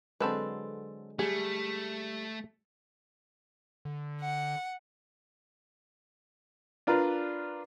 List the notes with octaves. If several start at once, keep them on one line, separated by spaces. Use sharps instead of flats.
D3 F#3 G#3 C4 A4 B4
G3 A3 G#4
D3
F#5
D4 F4 A#4 B4 D5